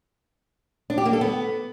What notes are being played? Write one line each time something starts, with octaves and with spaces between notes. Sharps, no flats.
D4
G4
A#3
A4
B3